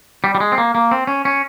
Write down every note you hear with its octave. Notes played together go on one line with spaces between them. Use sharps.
G3
G3
G#3
C4
A#3
A#3
C4
C#4
C#4